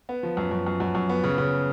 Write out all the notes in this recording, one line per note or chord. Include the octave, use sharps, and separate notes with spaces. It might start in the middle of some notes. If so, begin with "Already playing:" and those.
B3
F3
F#2
F#2
F#2
F#2
F#2
B3
C#3
C#3